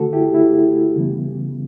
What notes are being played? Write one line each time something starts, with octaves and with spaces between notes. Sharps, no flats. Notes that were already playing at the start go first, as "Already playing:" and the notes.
Already playing: D3 A3 F#4 A4
E4 G4
E4
C#3 E3 G3 B3